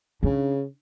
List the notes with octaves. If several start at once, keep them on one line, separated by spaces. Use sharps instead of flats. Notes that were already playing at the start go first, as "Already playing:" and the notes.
C#3 D4